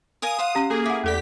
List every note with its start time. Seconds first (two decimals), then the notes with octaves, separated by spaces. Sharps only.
0.22 A#4 F5 G#5 D#6 D#7
0.38 C5 F5 F#5
0.55 C#4 G4
0.70 A#3 G#4 A4
0.86 E4 F#5 D6
1.04 E2 A3 G4 A4 D5 B6